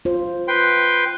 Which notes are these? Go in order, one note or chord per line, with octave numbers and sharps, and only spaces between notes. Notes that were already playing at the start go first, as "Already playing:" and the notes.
F4 C5
B4 G5 C6